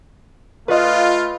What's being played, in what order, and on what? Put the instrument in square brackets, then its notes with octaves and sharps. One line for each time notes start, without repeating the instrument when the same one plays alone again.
[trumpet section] A3 F4 [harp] B4 D#5